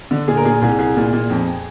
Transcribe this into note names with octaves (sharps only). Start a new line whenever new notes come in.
D3
A#2 G#4
A#4
A#2 G#4
C2 G#4
C2 G#4
A#2
A#2
F2